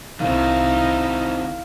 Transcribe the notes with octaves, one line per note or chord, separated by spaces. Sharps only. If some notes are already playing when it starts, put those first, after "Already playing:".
C2 D#3 C4 D#4 E4 F5